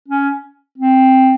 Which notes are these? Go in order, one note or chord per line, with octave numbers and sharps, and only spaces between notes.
C#4
C4